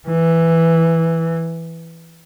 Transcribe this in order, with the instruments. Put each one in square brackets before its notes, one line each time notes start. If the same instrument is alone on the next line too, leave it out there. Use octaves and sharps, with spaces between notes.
[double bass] E3